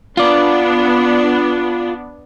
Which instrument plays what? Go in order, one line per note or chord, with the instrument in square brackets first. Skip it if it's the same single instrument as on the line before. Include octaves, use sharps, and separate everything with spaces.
[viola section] B3 D4 [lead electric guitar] F4 D5